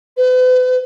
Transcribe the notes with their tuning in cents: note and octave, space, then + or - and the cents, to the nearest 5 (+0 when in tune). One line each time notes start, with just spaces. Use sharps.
B4 +40